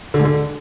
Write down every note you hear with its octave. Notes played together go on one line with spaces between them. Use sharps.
D3
G#2
D3